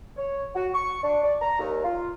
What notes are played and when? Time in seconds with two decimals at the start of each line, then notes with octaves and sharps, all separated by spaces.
0.17 C#5
0.55 F#4
0.75 C#6
1.04 D4
1.23 D5
1.42 A#5
1.60 D#2
1.84 F4